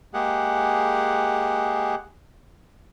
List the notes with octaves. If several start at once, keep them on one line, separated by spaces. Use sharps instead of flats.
G#3 A#3 G4 G#4 F#5